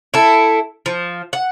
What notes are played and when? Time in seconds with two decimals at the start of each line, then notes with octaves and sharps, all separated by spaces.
0.14 E4 A4
0.86 F3
1.33 F#5